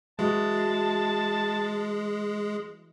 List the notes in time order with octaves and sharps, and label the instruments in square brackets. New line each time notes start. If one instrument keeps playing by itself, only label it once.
[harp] E3 F#4 [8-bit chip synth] G#3 [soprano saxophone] A5